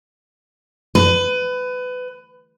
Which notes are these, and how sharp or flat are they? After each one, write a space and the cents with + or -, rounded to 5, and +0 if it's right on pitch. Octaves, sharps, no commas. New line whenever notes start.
B4 +25